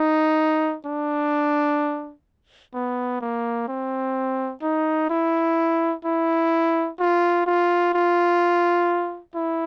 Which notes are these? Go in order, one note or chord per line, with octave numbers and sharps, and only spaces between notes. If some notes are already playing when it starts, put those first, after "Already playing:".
Already playing: D#4
D4
B3
A#3
C4
D#4
E4
E4
F4
F4
F4
E4